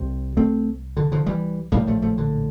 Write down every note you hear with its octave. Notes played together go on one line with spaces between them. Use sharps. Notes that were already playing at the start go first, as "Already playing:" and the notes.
Already playing: C2 C3
A3 C4
D3
D3 F3
E3 G3
A#1 A2 G3 A#3
F3 A3
F3 A3
D3